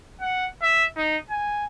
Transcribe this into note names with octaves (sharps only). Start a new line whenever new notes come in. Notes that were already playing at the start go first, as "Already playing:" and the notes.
F#5
E5
D#4
G#5